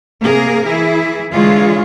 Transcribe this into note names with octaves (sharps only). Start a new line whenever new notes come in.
C3 A#3 G#4 A#4
E3 E4 G#4
D3 E3 G#3 F4 G#4 C#5